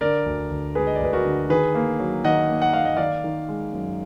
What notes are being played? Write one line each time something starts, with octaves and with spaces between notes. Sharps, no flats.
D3 A#4 D5
D2
D2
G#3 G#4 B4
D#5
D5
D2 B4
F#4 A#4
D3
D#3 G#4 B4
A#3
F#3
D#3 D#5 F#5
A#3
F#5
A#3 F5
D#5
D#3 D5 F5
D#3
G#3
F#2